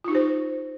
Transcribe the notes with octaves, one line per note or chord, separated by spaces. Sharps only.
D#4 F4 G4 C5